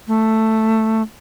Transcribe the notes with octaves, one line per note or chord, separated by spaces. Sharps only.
A3